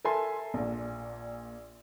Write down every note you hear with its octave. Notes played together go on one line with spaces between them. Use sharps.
A4 A#4 E5 G#5 A5 C6
A#1 A#2